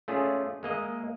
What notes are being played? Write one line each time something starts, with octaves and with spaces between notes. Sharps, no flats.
A3 C#4 F4 G#4 D5
G#3 A#3 D#5 E5